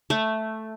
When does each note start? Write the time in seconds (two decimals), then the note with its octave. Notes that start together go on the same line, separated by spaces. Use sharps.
0.10 A3